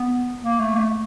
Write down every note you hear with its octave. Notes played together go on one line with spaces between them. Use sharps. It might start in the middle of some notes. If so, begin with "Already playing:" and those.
Already playing: B3
A#3
A3
A#3
A3